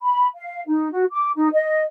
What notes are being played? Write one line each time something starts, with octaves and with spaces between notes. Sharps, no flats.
B5
F5
D#4
F#4
D6
D#4
D#5